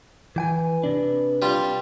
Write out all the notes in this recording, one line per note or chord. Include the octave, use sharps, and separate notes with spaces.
E3 B4 G5 G#5
C3 D4
G3 F4